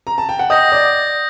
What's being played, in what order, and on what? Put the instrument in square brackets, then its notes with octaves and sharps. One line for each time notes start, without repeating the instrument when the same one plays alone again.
[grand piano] A#5
A5
G5
F#5
[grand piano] D#5 [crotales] D#6 G6 A#6
[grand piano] D5